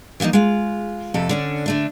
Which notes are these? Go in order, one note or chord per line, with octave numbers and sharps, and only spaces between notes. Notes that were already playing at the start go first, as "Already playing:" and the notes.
E3 F3 A3 A#3 D#4
G#3 F4
F2 C3 A4
D3 C#4 D4
D3 A3 D4